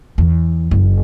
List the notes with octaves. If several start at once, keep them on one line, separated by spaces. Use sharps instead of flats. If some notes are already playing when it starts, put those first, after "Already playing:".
E2
F#1